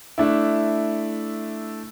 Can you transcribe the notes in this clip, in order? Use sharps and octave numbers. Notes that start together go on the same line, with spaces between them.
A3 D4 E4